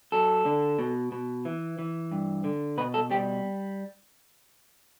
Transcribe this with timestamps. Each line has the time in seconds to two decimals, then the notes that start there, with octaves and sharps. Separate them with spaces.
0.12 F#3 A4
0.46 D3
0.79 B2
1.12 B2
1.45 E3
1.79 E3
2.12 G2
2.44 D3
2.78 B2 B4
2.94 A4
3.11 G3 G4